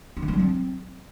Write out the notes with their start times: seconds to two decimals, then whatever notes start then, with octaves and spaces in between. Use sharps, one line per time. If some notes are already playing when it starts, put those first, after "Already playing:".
0.17 D#4
0.22 D#3
0.28 A3
0.34 F#3
0.39 C4